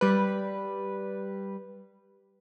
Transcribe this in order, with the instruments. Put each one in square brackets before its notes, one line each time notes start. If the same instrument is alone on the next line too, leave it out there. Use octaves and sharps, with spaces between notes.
[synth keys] G3 B4